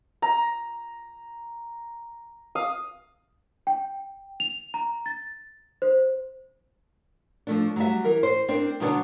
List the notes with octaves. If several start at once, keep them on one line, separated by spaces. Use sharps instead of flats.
A#5
F5 D#6
G5
F7
A#5
A6
C5
F3 A3 D4
F#3 G3 E5
E3 A#4
C5
C4 D4 A#4 C5
B2 D3 F#3 A#3 B3 D4